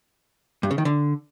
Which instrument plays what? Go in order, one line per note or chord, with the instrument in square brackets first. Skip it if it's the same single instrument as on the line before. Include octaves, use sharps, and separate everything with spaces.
[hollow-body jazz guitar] G2
C#3
D#3
D3